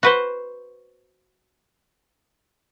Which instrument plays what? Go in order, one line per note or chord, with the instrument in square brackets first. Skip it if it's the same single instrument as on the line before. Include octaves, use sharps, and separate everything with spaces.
[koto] F#4 B4 C5